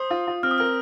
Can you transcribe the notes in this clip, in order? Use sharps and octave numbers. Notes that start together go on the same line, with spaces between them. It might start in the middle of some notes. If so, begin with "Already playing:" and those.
Already playing: C5 D#6
F4
F4
C4 F6
D#6
A#4 F6